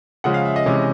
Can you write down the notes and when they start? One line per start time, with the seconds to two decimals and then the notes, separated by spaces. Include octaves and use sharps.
0.24 C#3 F3 G#3 C#4 F#5
0.34 F5
0.45 E5
0.56 D#5
0.66 C3 E3 G#3 C#4